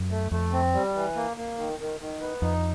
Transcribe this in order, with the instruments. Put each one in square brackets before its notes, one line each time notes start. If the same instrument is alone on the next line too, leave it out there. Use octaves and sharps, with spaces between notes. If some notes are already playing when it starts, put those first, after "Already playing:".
Already playing: [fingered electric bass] F#2
[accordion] A3
[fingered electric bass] F2 [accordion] A3
[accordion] C4
G3
E3
A#3
A#3
D#3
D#3
D#3
B3
[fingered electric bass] F2 [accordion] D#4